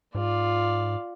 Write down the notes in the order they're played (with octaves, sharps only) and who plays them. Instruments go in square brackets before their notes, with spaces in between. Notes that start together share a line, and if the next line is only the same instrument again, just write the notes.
[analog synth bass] G#2 [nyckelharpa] F4 D5